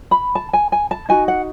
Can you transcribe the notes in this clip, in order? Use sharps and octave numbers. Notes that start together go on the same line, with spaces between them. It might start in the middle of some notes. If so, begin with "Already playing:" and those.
B5
A5
G#5
G#5
A5
D#4 F#4 G#5
F#5